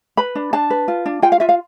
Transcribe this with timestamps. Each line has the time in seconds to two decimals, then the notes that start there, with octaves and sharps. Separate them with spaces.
0.17 B4 B5
0.35 D4
0.53 D4 A5
0.70 B4
0.88 F4
1.06 D4
1.22 F4 G5
1.32 F5
1.40 F4 E5
1.49 F5